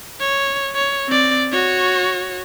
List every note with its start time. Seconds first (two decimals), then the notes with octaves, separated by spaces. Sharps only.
0.20 C#5
0.75 C#5
1.09 C4 D5
1.52 F#4 C#5